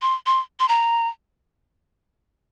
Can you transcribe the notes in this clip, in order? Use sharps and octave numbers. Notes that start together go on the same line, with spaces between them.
C6
C6
C6
A#5